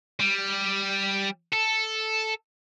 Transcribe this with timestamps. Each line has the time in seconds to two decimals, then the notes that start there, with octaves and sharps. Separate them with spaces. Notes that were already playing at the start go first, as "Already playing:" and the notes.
0.20 G3
1.53 A4